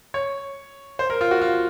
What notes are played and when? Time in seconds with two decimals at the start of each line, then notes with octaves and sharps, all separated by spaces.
0.14 C#5
0.99 C5
1.10 A#4
1.21 F4
1.31 F#4
1.41 F4